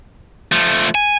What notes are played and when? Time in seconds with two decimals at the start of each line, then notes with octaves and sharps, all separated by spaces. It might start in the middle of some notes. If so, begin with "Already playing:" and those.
0.52 F3 A3
0.95 G#5